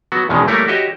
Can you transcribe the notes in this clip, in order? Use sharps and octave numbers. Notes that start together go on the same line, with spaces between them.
F#3 B3 F#4
E2 B2 D#3 G#3 C#4
G3 A3 A#3 E4 A#4 C#5
F#4 G4 C#5 D#5 E5